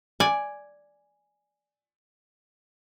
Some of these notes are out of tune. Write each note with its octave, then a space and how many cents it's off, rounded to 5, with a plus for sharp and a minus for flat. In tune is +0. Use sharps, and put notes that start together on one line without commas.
D5 +0 G#5 +0